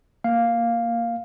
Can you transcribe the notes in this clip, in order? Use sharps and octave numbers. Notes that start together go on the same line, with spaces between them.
A#3 F5